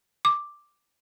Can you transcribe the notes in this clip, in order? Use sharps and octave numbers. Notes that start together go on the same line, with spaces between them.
D6